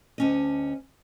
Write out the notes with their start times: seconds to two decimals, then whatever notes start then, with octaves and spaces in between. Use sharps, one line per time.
0.18 D2 C#4 D#5